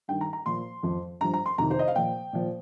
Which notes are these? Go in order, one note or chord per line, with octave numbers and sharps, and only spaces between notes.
G2 D#3 G5
A#5
A#5
A#2 F3 C6
F2 F3
G2 F3 A#5
A#5
C6
F2 C3 D#3 A#5
C5
D#5
F5
A#2 F3 G5
A#2 F3